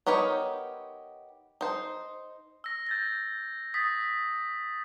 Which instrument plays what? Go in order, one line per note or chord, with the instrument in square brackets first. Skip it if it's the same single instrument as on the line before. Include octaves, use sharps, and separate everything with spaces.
[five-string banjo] B3 D#4 G4 A#4 C#5
D#4 C5
[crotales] E6 A#6
G6 A6 A#6
D#6 A6 B6